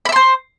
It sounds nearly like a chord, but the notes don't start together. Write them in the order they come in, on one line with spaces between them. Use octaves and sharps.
B5 E5 C6 C5